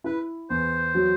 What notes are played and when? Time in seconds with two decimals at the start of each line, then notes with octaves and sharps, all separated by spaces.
0.04 E4 B4
0.50 E2 C5
0.95 F#3